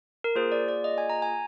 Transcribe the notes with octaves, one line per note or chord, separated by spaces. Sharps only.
A#4
A#3 F4 G#4 C5
D5
D5
D#5
G#5
A#5
G#5